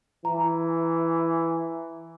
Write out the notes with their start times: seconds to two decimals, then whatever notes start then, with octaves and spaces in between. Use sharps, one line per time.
0.25 E3 A#5